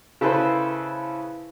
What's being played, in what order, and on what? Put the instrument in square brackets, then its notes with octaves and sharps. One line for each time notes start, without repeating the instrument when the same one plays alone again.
[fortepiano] C#3 E4 A4 B4 C5